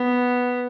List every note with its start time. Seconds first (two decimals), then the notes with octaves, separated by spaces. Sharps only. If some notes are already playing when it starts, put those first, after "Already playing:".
Already playing: B3